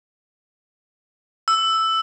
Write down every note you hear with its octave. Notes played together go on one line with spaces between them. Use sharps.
E6